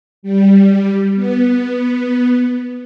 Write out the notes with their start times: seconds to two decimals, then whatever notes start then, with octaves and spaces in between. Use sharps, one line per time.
0.23 G3
1.15 B3